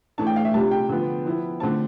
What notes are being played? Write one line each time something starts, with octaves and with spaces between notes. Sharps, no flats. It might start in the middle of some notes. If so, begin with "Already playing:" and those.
A2 E3 A3 D4 A5
G5
F5
E5
C3 G3 D4 F4 A5
G5
D3 F3 B3 F4
F3 B3 E4
D3 A3 C4 F4 A5